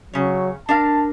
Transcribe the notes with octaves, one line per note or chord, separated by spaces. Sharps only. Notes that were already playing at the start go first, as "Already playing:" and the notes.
C#3 F#3 C#5
D4 A#4 F5 A5